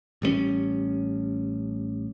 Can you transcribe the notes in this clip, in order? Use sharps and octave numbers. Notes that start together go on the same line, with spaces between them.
A1 G3 G#3 C#4